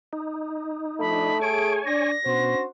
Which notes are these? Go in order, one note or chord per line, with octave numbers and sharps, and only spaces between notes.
D#4
F3 A3 D4 B5
G#4 C#5 G#5 D7
D4 D5 A#6
B2 C#4 D4 F#4 C5